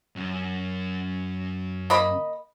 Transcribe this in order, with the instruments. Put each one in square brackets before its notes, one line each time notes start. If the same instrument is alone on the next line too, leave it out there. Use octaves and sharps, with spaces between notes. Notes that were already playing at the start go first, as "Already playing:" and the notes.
[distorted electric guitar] F#2
[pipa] A#3 D#5 B5